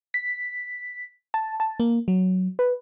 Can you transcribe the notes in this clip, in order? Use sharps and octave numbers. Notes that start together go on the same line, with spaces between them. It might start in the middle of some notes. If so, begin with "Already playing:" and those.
B6
A5
A5
A#3
F#3
B4